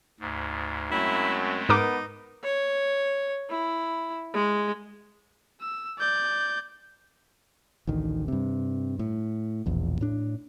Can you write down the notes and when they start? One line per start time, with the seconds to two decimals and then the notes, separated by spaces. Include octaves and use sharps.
0.20 D2 G#2
0.92 F#2 G#3 A3 C4 E4
1.69 G#2 B3 D#4 A#4 D6
2.43 C#5
3.49 E4
4.33 G#3
5.61 E6
5.99 D5 G6
7.87 A1 D2 D#3
8.28 G2 C3
8.99 A2
9.66 E1 A#1 E2
10.01 A2 D4